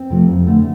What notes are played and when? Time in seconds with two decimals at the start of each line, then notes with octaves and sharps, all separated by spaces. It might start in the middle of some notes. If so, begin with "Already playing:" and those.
Already playing: C4
0.10 C3 F3 A3
0.29 F2
0.47 D3 A3